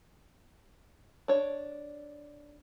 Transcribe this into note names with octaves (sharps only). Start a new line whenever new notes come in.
D4 C#5